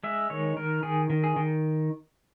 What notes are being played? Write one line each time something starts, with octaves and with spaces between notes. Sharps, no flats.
G#3 E5
D#3 C#5
D#3 A#4
D#3 G#4
D#3
G#4
D#3